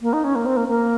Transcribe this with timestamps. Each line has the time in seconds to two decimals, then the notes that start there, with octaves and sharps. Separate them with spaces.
0.02 A#3
0.13 D#4
0.24 C#4
0.35 A#3
0.46 C4
0.57 A#3
0.68 A#3